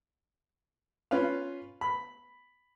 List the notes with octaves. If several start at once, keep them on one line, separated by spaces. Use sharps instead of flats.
C#4 F4 B4 F5
B5